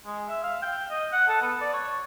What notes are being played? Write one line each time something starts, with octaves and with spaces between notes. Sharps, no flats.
G#3
E5
F5
G5
D#5
F#5
A4
B3
D5
C#5